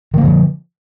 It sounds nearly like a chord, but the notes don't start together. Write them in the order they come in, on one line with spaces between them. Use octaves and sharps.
D#3 A#3 D3 F3